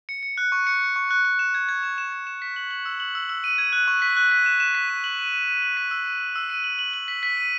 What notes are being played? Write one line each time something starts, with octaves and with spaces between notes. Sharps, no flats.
C#7
C#7
F#6
C#6
C#7
C#7
C#6
F#6
F#6
E7
G#6
G#6
E7
E7
G#6
E7
B6
F#7
F#7
E6
F#7
E6
E6
D#7
G#6
F#6
C#6
B6
F#6
B6
E7
E7
B6
D#7
F#7
D#7
D#7
D#7
F#7
B6
E6
D#7
E6
E6
D#7
F#7
F#7
F#7
B6
B6
D#7